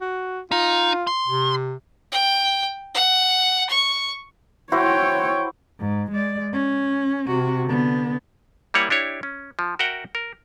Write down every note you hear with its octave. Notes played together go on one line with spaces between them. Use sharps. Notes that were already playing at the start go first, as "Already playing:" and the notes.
F#4
D#4 F4
C6
C3
G5
F#5
C#6
E4 F#4 C5 C#5 G5
G#2
G#3 D5
C#4
C3 F#4
D3 B3
G3 A#3 E4 C#5 F#5 G#5
D4 E4 G4 C#5
C#4
F3
F#4 A#4 E5 F#5 G5
A#4